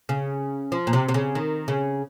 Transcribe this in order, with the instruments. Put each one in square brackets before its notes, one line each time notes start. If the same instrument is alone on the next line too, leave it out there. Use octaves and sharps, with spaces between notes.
[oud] C#3
F3
A#2
C3
C3
C#3
D#3
C#3